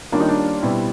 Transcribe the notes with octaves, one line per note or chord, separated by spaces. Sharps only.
D#3 G3 A#3 C#4 D4 F4
D#4
D4
B2 G3 C4 E4